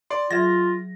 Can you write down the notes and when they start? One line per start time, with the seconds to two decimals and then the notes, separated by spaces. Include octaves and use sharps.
0.10 D5 C6
0.31 F#3 F4 G#4 E5 A#6